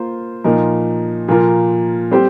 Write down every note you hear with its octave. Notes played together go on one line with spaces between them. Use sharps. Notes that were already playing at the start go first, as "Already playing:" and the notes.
Already playing: A#3 F4 C5
A#2 F3 D#4 A#4
A#2 F3 A#3 F4 A#4
G3 C4 G4 C5